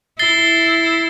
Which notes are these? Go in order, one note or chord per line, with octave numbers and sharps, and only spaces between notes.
E4 A6 C7 G7